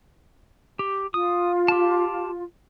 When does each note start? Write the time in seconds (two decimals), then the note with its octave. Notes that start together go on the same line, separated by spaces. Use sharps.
0.79 G4
1.14 F4 D#6
1.68 G4 A5